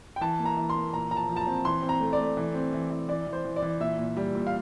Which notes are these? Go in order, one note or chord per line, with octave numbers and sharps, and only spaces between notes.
G5
E3 A5
A#3
A#5
E3
C6
A#3
A#2 A#5
F3 A#5
A5
F3
A5
A#5
C4
E3 C6
C4
A#5
A3
D5
A3
E3
C4
E3
E3
E3 D5
E3
C5
E3
D5
E3
A#2 E5
A#2
G3
A#2
F5